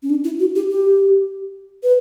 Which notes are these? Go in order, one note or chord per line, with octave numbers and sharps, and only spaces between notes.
C#4
D4
E4
F#4
G4
G4
B4